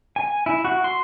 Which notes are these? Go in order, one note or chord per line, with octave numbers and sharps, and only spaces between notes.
G#5
E4
F#4
C6